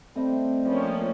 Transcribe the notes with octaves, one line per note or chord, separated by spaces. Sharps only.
G3 A3 C4 D#5
F3 G3 A#3 C#4